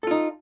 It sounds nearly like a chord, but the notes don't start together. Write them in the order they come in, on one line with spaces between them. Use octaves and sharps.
A4 F4 D#4